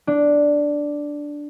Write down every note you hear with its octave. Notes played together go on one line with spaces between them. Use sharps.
D4